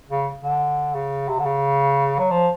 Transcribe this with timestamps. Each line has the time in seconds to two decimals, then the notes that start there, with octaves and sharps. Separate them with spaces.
0.09 C#3
0.43 D3
0.95 C#3
1.29 C3
1.39 D3
1.45 C#3
2.19 F#3
2.31 F3